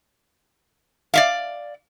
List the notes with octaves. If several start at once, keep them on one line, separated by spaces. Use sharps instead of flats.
D5 E5 F5